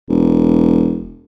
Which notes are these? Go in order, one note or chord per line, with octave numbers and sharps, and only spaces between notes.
E1